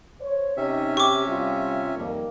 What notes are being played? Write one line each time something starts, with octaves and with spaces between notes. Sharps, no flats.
C5 C#5
C3 C#4 D#4 G4 E5
G4 C#6 D6
G3 F4
F2 D#3 G3 A#3